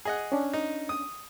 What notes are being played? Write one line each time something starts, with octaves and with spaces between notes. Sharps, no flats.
G#4 D#5 F#5
C#4 D4
D#4
D#6